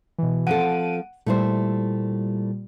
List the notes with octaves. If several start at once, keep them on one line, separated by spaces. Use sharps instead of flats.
B2 E3
F3 C4 A4 F#5 D7 D#7
A#2 G3 A3 E4 C5